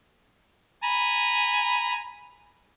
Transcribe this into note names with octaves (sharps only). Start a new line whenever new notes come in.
G#5 A#5 B5